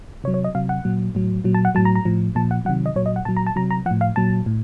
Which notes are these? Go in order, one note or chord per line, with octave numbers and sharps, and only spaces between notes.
C3 F#3 C#5
C#5
D#5
C3 F#3 F5
F#5
A#2 F#3
A2 F#3
A#2 F#3
A5
F#5
A2 F#3 A5
A#5
A#5
A2 F3
A#2 F3 A5
F#5
C3 D#3 F#3 F#5
D#5
A#2 F#3 C#5
D#5
F#5
A#2 F#3 A5
A#5
A5
C3 F#3 A#5
A#5
F3 F#5
A2
F5
A#2 F#3 A5
A2